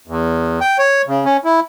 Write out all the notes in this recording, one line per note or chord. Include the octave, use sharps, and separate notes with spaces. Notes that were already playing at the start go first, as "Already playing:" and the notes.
E2
G5
C#5
C#3
C#4
E4